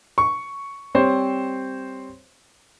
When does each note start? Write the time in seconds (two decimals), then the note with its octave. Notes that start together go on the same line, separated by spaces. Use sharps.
0.18 C#6
0.94 G3 C4 C5 C#5